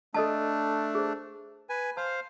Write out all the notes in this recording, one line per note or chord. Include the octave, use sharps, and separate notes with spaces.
A3 D4 A4 D#5 A5
G#4 C5
B4 G#5
C5 F5 A5